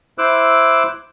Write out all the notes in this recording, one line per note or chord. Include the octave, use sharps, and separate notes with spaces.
E4 C5 D6 E6 F#6